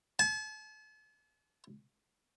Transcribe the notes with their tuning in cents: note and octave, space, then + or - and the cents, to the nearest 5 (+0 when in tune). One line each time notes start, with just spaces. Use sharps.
A5 -40